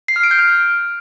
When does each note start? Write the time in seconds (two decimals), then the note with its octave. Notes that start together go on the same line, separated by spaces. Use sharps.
0.08 C7
0.16 F6
0.24 D7
0.31 G6
0.39 F6